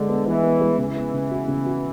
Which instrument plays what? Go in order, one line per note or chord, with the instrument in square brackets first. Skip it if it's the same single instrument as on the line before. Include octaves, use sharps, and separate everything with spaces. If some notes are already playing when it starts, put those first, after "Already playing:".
Already playing: [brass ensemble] D3 [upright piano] G#3 D4
[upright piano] B3
[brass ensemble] E3 [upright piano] B3
[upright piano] B3
G#3
[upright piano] C#3 [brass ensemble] E3
[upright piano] B3
C#3
F#4
C#3
F#4